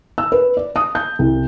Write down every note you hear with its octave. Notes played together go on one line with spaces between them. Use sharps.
E6
B4
D5
D#6
G6
C2